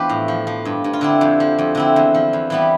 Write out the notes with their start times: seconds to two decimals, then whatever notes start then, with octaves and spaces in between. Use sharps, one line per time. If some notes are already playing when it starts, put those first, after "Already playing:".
Already playing: E2 F3 D4 G4 B4
0.09 A2
0.28 F3
0.47 F3
0.65 G2
0.84 G2
0.93 F4
1.01 D3 C4 E4
1.21 F2
1.40 F3
1.58 F2
1.75 D3 C4 E4
1.96 E2
2.14 F3
2.33 E2
2.50 E3 G3 B3